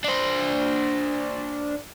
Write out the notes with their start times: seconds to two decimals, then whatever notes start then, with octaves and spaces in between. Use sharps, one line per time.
0.04 D4 C5